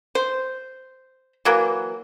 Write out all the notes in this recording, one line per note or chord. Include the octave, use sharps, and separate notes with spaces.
C5
E3 F#3 A#3